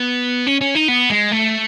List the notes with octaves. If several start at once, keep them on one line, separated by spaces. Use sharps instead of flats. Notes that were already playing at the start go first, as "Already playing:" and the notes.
Already playing: B3
C#4
C#4
D#4
B3
G#3
A3